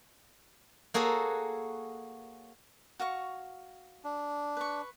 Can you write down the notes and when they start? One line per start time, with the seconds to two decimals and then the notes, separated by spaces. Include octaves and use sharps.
0.94 A#3 F#4 G#4 A4 C#5
3.00 F#4 F5 C#6
4.04 D4
4.57 B4 C#6